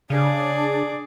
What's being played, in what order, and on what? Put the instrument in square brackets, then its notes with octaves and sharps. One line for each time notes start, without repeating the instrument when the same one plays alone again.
[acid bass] C#3 [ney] D4 [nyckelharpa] G#4 D6 [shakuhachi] D5